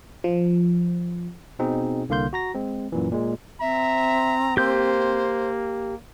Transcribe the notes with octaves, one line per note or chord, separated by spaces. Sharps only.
F3
B2 C4 D#4 G#4
C2 D3 A#3 F5 C6 G6
F#4 A#5 A#6
G#3 C4
F#2 A#2 E3
A#2 G#3
C4 E5 A#5
A#3 G4 C5 G6